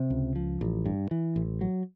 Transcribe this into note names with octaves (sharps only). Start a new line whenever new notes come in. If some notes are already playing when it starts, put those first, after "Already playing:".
Already playing: C3
C#2
F3
A1
G2
E3
A1
F#3